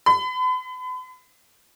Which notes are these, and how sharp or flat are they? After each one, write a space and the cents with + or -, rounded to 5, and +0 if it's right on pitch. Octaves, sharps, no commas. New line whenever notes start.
B5 +40